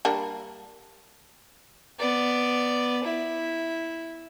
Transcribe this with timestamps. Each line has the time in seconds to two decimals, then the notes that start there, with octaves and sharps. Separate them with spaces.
0.05 G3 A#3 D4
1.99 B3 D5
3.04 E4